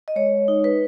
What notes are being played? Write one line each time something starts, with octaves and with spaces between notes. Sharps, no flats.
D#5
G#3 C#5
D#4
B4